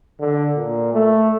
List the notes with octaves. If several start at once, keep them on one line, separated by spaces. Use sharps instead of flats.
D3
A#2
A3